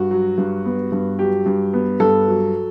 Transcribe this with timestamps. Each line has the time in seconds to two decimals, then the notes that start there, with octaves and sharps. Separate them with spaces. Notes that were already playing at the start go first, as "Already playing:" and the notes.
Already playing: G2 F#4
0.11 F#3
0.38 G2
0.65 B3
0.92 G2
1.19 F#3 G4
1.46 G2
1.73 B3
2.00 G2 A4
2.28 F#3